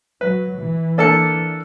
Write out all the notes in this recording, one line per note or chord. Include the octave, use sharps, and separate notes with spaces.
F#3 B4
E3
A#3 D4 A4 D5 C#7